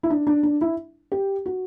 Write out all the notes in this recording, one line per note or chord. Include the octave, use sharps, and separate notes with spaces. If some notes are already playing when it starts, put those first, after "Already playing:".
E4
D4
D4
D4
E4
G4
F#4